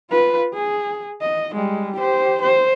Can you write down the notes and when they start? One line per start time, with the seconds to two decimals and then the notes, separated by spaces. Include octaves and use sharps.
0.10 F4 B4
0.54 G#4
1.21 D#5
1.55 G3 G#3
1.96 G4 C5
2.42 C5